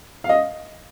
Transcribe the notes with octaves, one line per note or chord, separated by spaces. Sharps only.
F5
D#5